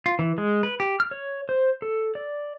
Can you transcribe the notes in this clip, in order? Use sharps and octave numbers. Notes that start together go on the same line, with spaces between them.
F4
E3
G#3
B4
G4
F6
C#5
C5
A4
D5